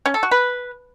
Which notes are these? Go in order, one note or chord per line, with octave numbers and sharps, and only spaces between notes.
C#4
A4
F#4
B4